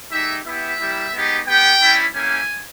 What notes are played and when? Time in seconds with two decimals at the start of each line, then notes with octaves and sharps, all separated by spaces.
0.11 G#3 D#4 G4 E5
0.45 B3 E4 G4 E5
0.79 G3 A#3 E4 G4
1.13 G#3 B3 D#4 G4
1.46 B3 G4 G5
1.80 G3 C#4 E4
2.13 A#3 C#4 E4 G4 G#5